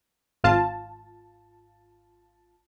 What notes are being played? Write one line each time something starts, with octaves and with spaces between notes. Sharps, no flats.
G#1 F4 A5